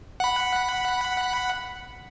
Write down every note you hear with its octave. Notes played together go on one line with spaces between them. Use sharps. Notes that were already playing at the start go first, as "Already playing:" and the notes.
F#5 B5